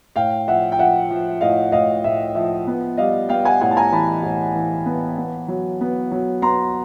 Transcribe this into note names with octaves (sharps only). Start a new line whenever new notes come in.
A2 F5 G5
F3 E5 F#5
G5
F3 E5 F#5
F3
A2 D#5 F5
A2 D#5 F5
A2 E5
F3 E5
B3
G3 D#5 F5
B3 F5 G5
F#5 G#5
A2 F#5 G#5
A5
G#5 A#5
E3 A5 B5
A2
E3
B3
B3
F#3
B3
F#3
B3 A#5 C6